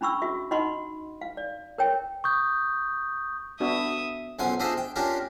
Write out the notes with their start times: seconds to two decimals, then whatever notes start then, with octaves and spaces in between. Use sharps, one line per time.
0.01 C#4 D4 B5 C#6 E6
0.22 F#4 E5
0.51 D#4 D#5 F#5 B5 C6
1.21 F5
1.37 D5
1.78 A#4 C#5 G5
2.24 C#6 D#6 G6
3.60 B3 D4 F#4 E5 D#6
4.39 B1 F#2 F3 F#5 G#5 C6
4.60 D4 F4 G#4 C5 D#5 E5
4.77 G5
4.96 C#4 D4 F4 G4 A#4